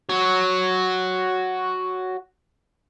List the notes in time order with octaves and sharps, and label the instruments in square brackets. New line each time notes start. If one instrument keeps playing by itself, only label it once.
[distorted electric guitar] F#4 C#5